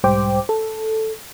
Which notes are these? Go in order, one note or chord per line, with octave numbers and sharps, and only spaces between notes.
B1 G#2 G3 C5 G5 D6
A4